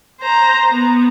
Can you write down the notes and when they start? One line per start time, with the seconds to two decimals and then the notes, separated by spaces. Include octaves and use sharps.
0.21 C5 A#5
0.71 B3